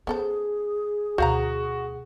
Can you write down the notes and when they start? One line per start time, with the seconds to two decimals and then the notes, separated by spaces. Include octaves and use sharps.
0.07 B3 C#4 G#4 A4 C5
1.18 D2 B2 F#4 C5 F5 A#5